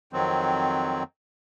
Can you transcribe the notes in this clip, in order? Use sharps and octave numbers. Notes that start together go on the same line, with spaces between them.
F2 D#3 F#3 C4